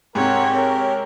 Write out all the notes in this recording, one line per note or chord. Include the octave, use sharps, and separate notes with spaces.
G#2 C3 C4 G4 A#4 C#5 F#5
A#4 C#5